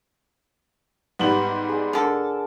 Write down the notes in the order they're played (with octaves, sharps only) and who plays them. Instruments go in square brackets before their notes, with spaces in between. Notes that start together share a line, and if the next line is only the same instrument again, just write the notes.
[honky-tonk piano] G#2 G3 F#7 [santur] B3
[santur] G#4 D5
[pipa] D3 A4 [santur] A#4